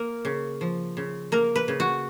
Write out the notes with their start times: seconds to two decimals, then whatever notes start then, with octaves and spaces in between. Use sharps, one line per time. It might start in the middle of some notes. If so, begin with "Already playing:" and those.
Already playing: A#3 A#4
0.25 C#3
0.61 F3
0.97 C#3
1.32 A#3 A#4
1.56 B4
1.68 C#3
1.80 F#4